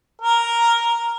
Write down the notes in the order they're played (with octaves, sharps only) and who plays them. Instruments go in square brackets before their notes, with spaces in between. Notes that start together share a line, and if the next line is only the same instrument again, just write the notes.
[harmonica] A#4